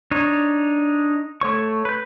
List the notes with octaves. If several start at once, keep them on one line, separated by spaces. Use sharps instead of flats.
D4 D#4 C#5
A3 C#5 C#6
B4 G6